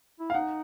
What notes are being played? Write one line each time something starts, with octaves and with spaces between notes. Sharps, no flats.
E4
F5
D#4 F#5